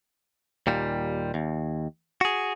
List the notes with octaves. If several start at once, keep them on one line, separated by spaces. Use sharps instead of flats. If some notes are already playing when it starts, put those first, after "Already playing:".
D#2 A#2 G3
D#2
F#4 G#4